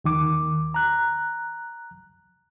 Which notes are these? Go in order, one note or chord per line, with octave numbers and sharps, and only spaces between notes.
D#2 D#3 D6
A#5 F#6